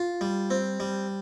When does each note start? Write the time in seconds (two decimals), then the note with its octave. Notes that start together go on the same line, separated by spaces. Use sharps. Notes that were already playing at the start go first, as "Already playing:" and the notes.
Already playing: F4
0.21 G3
0.50 C4
0.80 G3